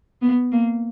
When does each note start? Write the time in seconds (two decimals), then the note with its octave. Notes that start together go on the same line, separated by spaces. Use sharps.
0.22 B3
0.52 A#3